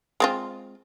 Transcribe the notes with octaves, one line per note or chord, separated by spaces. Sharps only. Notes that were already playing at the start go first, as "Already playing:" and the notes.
G#3 C4 F4